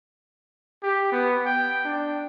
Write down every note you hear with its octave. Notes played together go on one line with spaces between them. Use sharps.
G4
B3
G5
D4